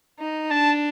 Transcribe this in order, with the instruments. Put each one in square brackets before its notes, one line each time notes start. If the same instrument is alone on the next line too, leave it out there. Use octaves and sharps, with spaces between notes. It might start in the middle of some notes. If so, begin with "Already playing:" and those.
[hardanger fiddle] D#4
[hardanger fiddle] D4 [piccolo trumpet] A5